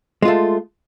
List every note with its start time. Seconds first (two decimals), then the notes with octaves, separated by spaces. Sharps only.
0.22 G#3
0.25 F4
0.28 A3